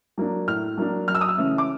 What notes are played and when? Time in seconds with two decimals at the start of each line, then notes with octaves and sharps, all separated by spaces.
0.18 F#3 A#3 D4
0.47 A2 F6
0.78 F#3 A#3 D4
1.08 F#2 F6
1.15 E6
1.21 D#6
1.28 E6
1.37 C#3 E3 A3 C#4
1.58 D6